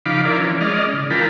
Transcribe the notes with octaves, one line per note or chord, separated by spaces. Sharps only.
C#3 F3 D#4 F5 B5 D6
E4 F4 A#4 D5
E3 F3 C#4
G#3 C#4 D5 D#5 F6
C#3
E3 F4 A#4 G5 A5 B5